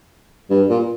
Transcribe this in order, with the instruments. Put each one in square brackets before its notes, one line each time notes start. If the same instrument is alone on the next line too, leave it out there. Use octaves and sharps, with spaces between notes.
[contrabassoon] G2
A#2